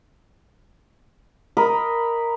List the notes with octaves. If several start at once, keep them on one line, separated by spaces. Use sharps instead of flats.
A#4 D#5 B5